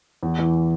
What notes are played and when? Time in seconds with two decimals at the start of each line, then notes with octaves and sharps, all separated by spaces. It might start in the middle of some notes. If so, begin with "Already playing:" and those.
0.23 E2
0.39 E3